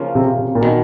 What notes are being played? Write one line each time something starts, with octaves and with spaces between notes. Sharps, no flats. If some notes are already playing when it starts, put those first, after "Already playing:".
Already playing: C#3 F3 A#3 C#4 F4
C3
C3
A#2
B2 D#3